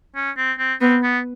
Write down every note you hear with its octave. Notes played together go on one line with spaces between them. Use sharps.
C#4
C4
C4
B3 C4
B3